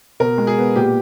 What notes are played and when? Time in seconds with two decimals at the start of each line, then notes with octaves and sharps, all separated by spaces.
0.20 B2 A#4
0.38 G#3
0.47 G#4
0.58 B3
0.76 A#2 G4